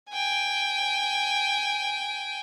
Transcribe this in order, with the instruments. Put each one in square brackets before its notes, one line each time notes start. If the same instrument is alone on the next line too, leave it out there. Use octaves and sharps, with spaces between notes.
[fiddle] G5 G#5